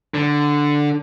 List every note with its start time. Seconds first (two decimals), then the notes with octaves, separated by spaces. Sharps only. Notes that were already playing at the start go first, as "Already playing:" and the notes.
0.14 D3